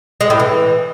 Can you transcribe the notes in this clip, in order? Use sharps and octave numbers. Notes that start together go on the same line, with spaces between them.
G#3
A2
E3